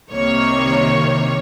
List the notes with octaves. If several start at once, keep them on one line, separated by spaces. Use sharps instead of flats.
C2 C3 D#3 G3 A#3 C#5